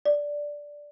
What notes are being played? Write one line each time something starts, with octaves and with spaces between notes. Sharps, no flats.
D5